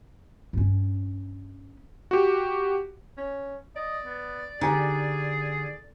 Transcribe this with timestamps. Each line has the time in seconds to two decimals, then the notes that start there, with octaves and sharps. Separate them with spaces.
0.53 G2 C#4
2.11 F#4 G4
3.18 C#4
3.76 D5 D#5
4.06 B3
4.61 D3 D#4 G4 G#4 G#5